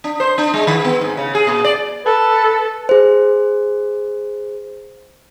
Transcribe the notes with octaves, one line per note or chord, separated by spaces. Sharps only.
D4
C5
D4
G#3
D#3
B3
G#2
C#3
G#4
A#2
D5
A4 B4
G#4 C5